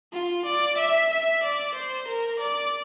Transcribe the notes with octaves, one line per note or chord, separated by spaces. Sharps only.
F4
D5
E5
E5
D5
C5
A#4
D5